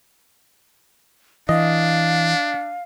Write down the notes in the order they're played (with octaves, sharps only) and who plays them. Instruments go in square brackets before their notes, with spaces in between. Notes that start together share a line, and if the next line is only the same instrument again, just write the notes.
[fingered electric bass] E3 [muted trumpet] D4 [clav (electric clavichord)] D#5 [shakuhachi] F5